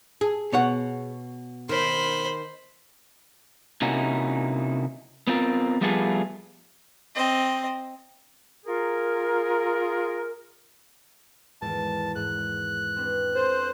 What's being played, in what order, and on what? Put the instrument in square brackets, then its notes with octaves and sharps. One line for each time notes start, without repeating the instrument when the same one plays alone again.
[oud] G#4
[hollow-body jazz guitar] B2 C#5 F#5
[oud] D#3 [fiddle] C5 B5
[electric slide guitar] C3 A#3 C#4 D#4 E4 F#4
B3 C4 F4 A#4
F3 G3 A3 B3 F4 G#4
[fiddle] C4 D#5
[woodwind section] F4 G#4 A#4
[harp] G#1 E2 G#2 [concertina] A5
[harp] G#2 [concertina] F#6
[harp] C4 D4 B4
[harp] A4 [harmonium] C5